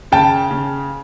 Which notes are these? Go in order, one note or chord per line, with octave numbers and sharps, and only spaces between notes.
C#3 G5 A5
C#3